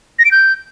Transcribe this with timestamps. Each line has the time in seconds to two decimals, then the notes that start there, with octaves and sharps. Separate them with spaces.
0.19 A#6
0.25 D7
0.31 G6